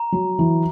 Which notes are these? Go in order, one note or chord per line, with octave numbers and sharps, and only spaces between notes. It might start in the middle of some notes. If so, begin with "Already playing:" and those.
Already playing: A#5
F#3
E3